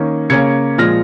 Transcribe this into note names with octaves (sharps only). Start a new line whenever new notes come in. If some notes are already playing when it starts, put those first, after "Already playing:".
Already playing: D#3 A#3 C#4
C#3 A#3 C#4 G#6 C#7
A#2 F3 G#3 F6 A#6